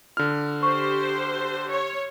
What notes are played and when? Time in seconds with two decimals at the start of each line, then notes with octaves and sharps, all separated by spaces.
0.17 D3 F4 F6
0.63 G4 C5 C#6
1.71 C#5